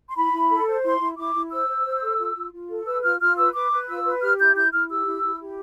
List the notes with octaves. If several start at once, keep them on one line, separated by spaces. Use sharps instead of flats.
C6
E4 B5
E4
A4
C5
E4 C6
E4
E4 D6
E4
C5 E6
C5
C5
A4
F4
F4
F4
A4
B4 E6
F4 F6
F4 F6
B4 E6
B4 D6
B4
F4 E6
B4
G4 F6
E4 G6
E4 G6
E4 F6
G4 E6
E4
E4
G4